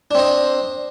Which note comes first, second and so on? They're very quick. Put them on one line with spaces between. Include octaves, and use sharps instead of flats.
D4 C4 D#5